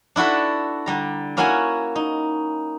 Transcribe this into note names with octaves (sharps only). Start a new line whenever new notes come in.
D4 E4 F#4 A4 B4
D3 G3 A#5
A#3 C#4 E4 F#4 F#5 G#5
D#4